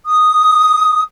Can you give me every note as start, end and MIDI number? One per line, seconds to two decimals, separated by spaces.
0.06 1.02 87